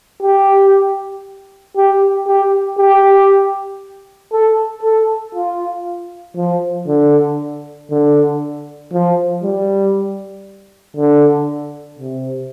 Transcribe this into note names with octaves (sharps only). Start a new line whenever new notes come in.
G4
G4
G4
G4
A4
A4
F4
F3
D3
D3
F3
G3
D3
C3